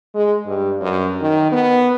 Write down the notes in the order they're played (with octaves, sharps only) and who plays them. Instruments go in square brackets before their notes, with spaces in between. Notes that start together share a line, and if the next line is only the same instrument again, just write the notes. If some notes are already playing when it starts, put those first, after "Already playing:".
[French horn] G#3
G2
F#2
D#3
B3